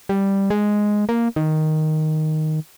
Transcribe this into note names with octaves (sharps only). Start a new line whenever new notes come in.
G3
G#3
A#3
D#3